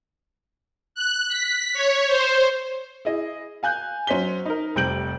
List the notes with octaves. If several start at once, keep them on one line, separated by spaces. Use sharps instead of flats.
F#6
B6
C#5
C5
E4 G#4 D#5
F5 G#5 F#6 G6
F#3 C#4 C5 B6 G7
D#4 A#4
F1 C3 G3 G6 D7 F#7